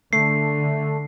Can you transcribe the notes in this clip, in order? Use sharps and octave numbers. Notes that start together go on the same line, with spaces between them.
D3 A3 C7